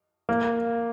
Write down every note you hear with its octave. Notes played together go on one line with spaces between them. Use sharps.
A#3